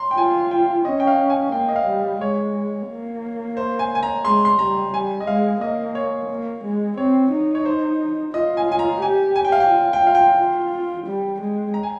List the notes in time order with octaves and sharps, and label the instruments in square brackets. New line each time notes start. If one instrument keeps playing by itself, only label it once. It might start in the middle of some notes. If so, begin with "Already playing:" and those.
Already playing: [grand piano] A#5 C6
G5
[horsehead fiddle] F4 [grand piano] G#5
[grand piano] G5
[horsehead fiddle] C#4 [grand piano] D#5
[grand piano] G5
F5
G#5
[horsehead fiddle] A#3 [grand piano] G5
[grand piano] D#5
F5
[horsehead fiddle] G3
[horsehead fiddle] G#3 [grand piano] C#5
[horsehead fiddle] A#3
[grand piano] C5
G#5
G#5
A#5
[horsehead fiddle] G#3 [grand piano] C6
[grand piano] C6
[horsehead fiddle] G3 [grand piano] A#5
[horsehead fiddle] G3 [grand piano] G#5
[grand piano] D#5
[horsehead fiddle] G#3 [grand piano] F5
[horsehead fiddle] A#3 [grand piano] D#5
[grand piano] C#5
[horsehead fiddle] A#3
G#3
[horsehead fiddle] C4 [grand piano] C#5
[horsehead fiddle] D#4
[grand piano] C#5
C5
[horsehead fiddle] F4 [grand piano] D#5
[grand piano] G#5
G#5
A#5
[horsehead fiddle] G4 [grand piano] G#5
[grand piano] G#5
G5
F5
G5
[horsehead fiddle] F4
[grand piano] G5
[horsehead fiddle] F4 [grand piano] F5
[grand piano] G5
[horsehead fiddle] F4
G3
G#3
[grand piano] A#5
G#5